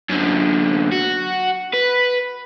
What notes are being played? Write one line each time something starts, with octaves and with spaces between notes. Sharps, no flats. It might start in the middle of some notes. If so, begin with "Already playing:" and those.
F#2 D3
F#4
B4